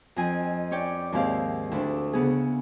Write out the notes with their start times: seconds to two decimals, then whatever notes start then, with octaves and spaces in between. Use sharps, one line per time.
0.16 F2 C4 D#5 G#5
0.71 C#4 C#5 D5 G5
1.12 D#2 G#2 C4 E4 G4 F5
1.71 D2 D4 E4
2.13 C#3 B3 G#4